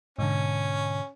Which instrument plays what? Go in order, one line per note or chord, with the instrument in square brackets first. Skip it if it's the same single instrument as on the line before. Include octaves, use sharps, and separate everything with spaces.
[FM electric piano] G#2 B2 D3 [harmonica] C#4